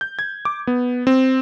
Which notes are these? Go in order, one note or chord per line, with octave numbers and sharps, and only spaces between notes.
G6
G#6
D6
B3
C4